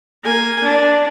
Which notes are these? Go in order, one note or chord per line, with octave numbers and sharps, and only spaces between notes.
A#3 G#5
D4